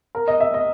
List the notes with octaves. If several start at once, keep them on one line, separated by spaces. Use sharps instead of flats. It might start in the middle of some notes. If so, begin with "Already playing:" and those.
A#4
D#5
E5
D#5